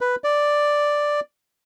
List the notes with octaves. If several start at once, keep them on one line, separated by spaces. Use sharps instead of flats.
B4
D5